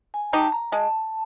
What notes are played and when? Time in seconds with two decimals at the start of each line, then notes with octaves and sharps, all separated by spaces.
0.14 G#5
0.33 D#4 G4 A5
0.52 A#5
0.72 G#3 A5